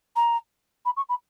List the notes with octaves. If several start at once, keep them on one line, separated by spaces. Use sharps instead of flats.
A#5
B5
C#6
B5